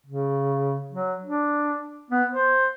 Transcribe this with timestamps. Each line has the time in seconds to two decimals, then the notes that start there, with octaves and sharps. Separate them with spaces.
0.07 C#3
0.92 F#3
1.24 D4
2.11 B3
2.32 C5